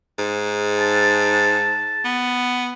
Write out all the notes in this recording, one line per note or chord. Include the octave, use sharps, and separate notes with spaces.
G#2
A5
B3